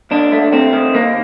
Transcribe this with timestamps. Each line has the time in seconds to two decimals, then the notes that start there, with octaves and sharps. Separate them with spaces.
0.11 D#2 D4
0.32 A3
0.52 A3 C4
0.73 D#3
0.94 D#2 A#3